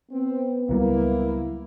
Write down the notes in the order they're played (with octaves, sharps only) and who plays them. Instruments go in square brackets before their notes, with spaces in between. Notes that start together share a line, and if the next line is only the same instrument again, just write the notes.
[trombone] B3 [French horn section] C4
[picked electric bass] C#2 F#3 G3 [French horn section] A#3 E4